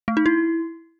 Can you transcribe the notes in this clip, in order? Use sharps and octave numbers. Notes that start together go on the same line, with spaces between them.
A3
D#4
E4